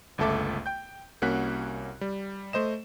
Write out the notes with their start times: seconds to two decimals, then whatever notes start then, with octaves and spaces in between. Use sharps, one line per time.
0.18 G1 C#2 A3 A4 E5 D6
0.66 G5 G6
1.22 C2 A#3 C#4 F#4 F#6 B6
2.01 G3
2.53 A3 C5 D#5 E7